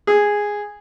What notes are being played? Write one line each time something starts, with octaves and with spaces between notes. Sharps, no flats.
G#4